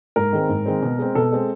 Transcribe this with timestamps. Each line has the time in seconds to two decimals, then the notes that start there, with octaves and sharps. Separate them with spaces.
0.16 G#2 A#4
0.33 D#3 G#3 C4
0.49 G#2
0.66 D#3 G#3 C4
0.82 B2
0.99 G#3 C4
1.15 B2 A4
1.32 G#3 C4